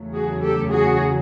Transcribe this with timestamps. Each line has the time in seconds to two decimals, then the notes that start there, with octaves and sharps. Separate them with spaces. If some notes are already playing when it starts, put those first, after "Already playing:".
Already playing: E2 C#3 F#3 A3
0.14 F#4 G#4
0.41 G4 A4
0.70 F#4 G#4